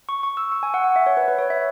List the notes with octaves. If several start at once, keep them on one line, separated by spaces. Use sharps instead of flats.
C#6
C#6
E6
C#6
G#5
F#5
F#5
E5
C#5
B4
B4
C#5
E5